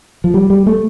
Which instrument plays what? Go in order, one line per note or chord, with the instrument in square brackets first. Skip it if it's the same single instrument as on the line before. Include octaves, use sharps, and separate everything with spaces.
[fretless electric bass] F3
G3
G3
A3